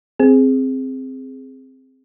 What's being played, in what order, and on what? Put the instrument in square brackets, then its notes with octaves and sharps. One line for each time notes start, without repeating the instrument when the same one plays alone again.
[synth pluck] C4 G#4